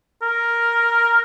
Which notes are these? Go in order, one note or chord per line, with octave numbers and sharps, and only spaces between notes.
A#4